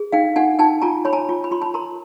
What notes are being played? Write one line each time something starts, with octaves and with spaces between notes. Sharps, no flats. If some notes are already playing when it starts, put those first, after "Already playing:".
Already playing: G#4
D#4 F5 G5
D#4 F#5 G#5
D#4 G5 A5
F4 G#5 A#5
C#5 B5
G#5 A#5
F4
B5
F4 C6
A5 B5
A#4 A#5 C6